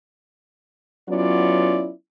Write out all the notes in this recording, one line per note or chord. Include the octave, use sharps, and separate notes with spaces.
F#3 B3 C#4 E4 F4 D5